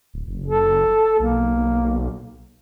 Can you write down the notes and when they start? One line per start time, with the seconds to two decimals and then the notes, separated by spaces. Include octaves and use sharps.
0.14 D1
0.28 F#1
0.46 A4
1.19 B1 A#3